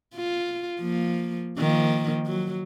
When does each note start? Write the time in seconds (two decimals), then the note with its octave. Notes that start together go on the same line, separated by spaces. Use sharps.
0.15 F4
0.81 F3 A#3
1.58 D#3 F3 A#3
2.26 F#3